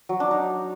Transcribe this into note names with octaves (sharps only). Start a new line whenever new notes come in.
F#3
D4
D#4